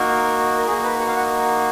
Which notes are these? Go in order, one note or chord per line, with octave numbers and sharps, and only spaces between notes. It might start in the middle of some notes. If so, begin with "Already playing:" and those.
Already playing: A#3 D#4 F#4 A#4
A#4
A#3 D#4 F#4 G#4
B4
F#5
F5
F#5